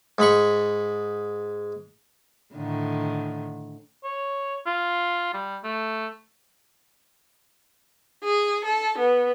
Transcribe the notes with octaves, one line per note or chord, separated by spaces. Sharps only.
G#2 G#3 B5 C#6
A2 D3 D#3
C#5
F4
G3
A3
G#4
A4
B3